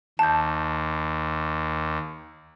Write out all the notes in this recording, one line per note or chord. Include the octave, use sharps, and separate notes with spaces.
D#2 A5 G6